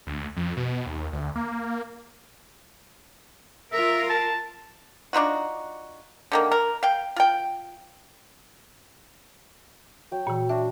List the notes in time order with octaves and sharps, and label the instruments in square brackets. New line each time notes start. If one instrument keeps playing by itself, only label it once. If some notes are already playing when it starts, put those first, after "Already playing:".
[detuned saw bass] D2
F2
B2
D#2
D2
A#3
[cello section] F4 A#4 [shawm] E5
[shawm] A5
[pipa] D4 D#4 F4 F#4
D3 D#3 A#3
A#4
F5 G5
F4 G5
[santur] F#3 G5
[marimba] A#2 E3
[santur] D4 F#4 [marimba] E5